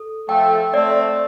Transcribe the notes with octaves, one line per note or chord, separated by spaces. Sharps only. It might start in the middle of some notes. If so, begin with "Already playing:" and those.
Already playing: A4
F3 A3 G5
A3 C4 D5